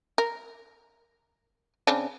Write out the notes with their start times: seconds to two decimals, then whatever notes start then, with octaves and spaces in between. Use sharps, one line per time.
0.18 A#4
1.87 C#3 C4 D4